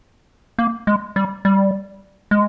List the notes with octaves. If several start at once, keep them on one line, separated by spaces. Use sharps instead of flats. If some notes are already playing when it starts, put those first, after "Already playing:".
A#3
G#3
G3
G3
G#3